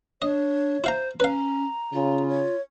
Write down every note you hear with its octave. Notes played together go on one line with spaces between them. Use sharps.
D4 C#5 D#5
E4 C5 F5 A#5
C#4 B4 F5 A#5
C#3 F4
C#5